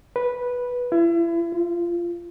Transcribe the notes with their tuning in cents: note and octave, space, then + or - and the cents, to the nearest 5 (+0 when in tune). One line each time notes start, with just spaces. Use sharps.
B4 -10
E4 +35
F4 -20